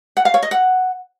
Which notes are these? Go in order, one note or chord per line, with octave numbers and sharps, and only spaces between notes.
F#5
F5
C#5
D#5
F#5